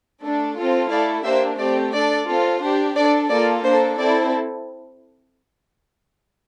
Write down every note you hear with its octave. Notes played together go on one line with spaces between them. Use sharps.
A3 D4 A4
C4 F4 A4
A3 E4 A4 D5 F5
A#3 D4 G4 C5 E5
A3 C4 G4 D5
D4 A4 D5
C4 F4 A4
D4 G4 C5
D4 A4 D5
A#3 F4 A4 D5
A#3 D4 A4 C5
C4 E4 A4 D5